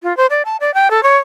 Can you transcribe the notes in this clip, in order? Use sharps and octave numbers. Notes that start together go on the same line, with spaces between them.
F4
C5
D5
A5
D5
G5
A4
C#5